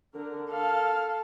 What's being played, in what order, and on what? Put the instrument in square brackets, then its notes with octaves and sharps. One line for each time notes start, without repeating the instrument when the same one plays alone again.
[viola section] D3 A#4
[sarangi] A4 [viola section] F5